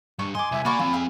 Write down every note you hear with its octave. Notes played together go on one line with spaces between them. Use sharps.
G2 C#6
D#5 G#5 C6 D6
C2 E5
A#3 F#4 D5 B5 C#6
F3 C4 F4
G#4 E5 F5